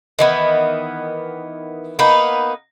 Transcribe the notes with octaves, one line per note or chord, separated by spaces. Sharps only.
D#3 E3 B3
A#3 B3 D#4 B4